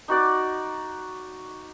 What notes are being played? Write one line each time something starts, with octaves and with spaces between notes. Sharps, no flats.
D#4 F#4 D5 D6